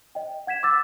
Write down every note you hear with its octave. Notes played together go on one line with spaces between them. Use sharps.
D#5 G5
F#5 G#6 B6 E7
D6 E6 A6